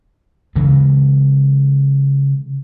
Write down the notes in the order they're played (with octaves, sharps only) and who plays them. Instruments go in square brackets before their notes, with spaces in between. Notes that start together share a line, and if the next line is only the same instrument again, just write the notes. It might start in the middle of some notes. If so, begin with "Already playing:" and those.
[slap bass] C#3 E3 G#3